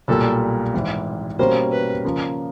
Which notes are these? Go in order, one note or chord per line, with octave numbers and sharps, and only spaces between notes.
B1 A#2 G3 A#3 A4
G#1 G#2 E3
B2 G3 A#3 C#4 C5
B4
C#3 F3 A#3